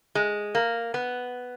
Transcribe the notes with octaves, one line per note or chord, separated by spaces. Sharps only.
G#3
A#3
B3